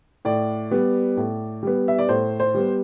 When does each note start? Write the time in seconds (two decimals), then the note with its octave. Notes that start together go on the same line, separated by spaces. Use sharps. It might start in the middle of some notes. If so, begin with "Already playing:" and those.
0.25 A2 D5
0.71 G3 B3
1.17 A2
1.63 G3 B3
1.88 E5
1.98 D5
2.09 A2 C5
2.40 C5
2.54 G3 B3